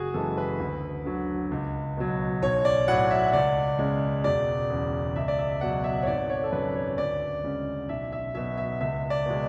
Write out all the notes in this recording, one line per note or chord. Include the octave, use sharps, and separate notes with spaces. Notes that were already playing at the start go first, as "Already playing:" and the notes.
Already playing: F#1 F#4 G#4
F#2 E3 G#3 A4
B4
D2
D3 F#3
C#2
B2 F#3
B1 C#5
D5
A2 F#3 F#5
E5
C#2 D5
C#3 G#3
E1 D5
E2 C#3
C#2 E5
D5
E5
B2 F#3 F#5
E5
C#5
G#1 D5
C#5
A4
F#2 C#3 B4
C#5
D2 D5
C#3 G#3
B1 E5
E5
B2 F#3 E5
E5
C#2 E5
D5
B2 G#3